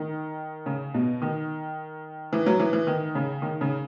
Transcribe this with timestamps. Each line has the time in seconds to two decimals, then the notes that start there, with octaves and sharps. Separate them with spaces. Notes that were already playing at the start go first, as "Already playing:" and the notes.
Already playing: D#3
0.66 C#3
0.94 B2
1.22 D#3
2.33 E3
2.46 F#3
2.60 E3
2.73 E3
2.87 D#3
3.15 C#3
3.42 D#3
3.61 C#3